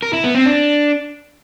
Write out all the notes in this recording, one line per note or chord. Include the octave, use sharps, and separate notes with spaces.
A#4
E4
B3
C4
D4